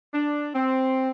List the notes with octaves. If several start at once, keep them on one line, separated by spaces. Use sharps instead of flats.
D4
C4